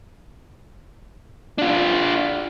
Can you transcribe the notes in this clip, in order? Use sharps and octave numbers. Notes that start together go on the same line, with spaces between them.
D4 F4